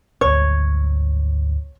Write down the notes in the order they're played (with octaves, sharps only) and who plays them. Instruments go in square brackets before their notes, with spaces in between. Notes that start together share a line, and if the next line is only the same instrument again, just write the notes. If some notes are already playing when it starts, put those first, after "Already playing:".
[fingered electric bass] G#1 D2 [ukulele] C#5